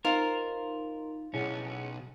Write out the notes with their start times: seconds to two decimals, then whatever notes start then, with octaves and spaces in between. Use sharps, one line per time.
0.05 D#4 F4 A#4 C5 F5
1.34 B1 C#4 E4 G#4 F#5